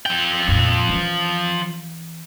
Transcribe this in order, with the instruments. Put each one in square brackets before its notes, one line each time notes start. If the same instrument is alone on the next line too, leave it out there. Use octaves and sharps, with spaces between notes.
[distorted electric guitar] F3 G5
[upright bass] F2 A#2
E3 C#4